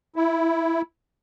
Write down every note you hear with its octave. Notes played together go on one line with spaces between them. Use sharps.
E4